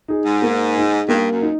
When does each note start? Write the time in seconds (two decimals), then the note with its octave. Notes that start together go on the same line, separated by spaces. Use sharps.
0.08 D#4 G#4
0.26 G#2
0.42 A#3
0.75 D#4 G#4
1.09 G2 A#3
1.31 F#2
1.42 D#4